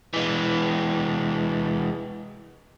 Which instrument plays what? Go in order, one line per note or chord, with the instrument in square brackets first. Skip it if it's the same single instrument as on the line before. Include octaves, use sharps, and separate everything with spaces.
[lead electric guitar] E3 G#3